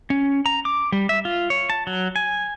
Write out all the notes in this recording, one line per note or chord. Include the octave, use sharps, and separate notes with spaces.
C#4
A#5
D6
G3
E5
F4
C#5
A5
F#3
G#5